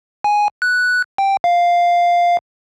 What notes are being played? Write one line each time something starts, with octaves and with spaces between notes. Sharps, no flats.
G#5
F#6
G5
F5